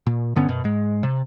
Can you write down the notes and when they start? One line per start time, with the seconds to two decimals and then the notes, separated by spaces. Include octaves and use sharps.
0.06 A#2
0.36 G2 D3 B3 C#4
0.48 F#2 B2
0.64 G#2 G#3
1.03 C3